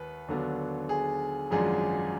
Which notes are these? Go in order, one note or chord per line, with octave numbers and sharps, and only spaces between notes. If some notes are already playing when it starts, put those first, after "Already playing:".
Already playing: D#2 D#3 B4
D#2 D3 F#3 B3 D4
G#4
G#1 F#2 F3 G#3 D4 G#4